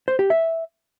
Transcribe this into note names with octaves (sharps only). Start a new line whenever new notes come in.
C5
G4
E5